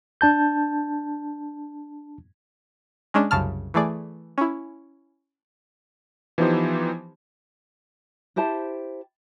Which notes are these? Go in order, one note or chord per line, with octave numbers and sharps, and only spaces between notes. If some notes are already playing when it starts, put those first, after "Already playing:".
D4 A5 G6
G#3 C#4 D4
C2 F#2 C#3 A5 F6
E3 A3 G#4 D5
C#4 E4
E3 F3 B3 D#4 G4 C5
E4 G4 C5 A5